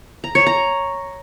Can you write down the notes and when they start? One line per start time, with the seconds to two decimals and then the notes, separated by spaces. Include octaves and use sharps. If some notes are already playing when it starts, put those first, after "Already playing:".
0.24 A#5
0.35 C#5
0.47 A#5